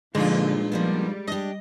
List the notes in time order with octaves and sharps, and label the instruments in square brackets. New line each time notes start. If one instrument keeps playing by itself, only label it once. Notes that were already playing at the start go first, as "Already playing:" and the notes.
[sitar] G2 D#4 F4 [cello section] A#2 F3 [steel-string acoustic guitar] D3 [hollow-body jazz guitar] G#3
[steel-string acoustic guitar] F3 A#3 B3 [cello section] G3
[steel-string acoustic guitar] D4 G4 [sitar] D#5